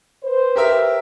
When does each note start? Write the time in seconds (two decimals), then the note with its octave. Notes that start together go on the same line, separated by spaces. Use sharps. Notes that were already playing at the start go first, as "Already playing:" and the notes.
0.23 B4 C5
0.56 G4 A#4 E5